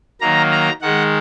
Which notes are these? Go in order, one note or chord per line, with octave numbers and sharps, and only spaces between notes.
D#3 F#3 A#3 A#5
A#5
D#3 G#3 F#5